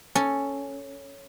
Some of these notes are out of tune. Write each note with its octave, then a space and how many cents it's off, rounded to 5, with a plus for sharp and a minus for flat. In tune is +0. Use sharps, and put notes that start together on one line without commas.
C#4 +0 A4 +0